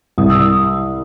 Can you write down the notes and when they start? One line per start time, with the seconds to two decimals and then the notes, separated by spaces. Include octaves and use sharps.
0.18 C2 D#6
0.30 E6
0.42 D#6